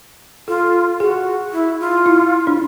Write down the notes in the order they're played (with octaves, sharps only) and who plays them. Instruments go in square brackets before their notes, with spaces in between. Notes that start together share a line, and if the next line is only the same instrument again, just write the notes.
[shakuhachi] F4 [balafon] A4
[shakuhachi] F#4 [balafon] G#4
[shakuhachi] E4
F4
[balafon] E4
D4